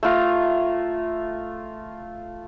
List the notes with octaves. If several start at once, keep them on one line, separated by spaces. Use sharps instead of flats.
A3 F4 A#5